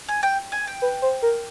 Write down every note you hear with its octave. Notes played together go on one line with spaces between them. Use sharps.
G#5
G5
G#5
G5
B4
C5
A#4